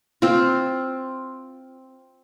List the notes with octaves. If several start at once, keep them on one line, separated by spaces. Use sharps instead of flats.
C4 F4